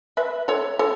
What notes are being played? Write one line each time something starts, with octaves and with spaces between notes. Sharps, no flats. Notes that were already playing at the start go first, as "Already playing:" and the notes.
B4 E5
A4 C#5
A4 C#5